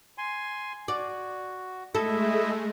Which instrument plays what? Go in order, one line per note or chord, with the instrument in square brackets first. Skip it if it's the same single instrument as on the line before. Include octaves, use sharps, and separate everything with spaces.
[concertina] G#5 C6
[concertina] F#4 [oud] D5
[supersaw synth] G#3 A3 [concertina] E4 D#5 E5 [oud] A4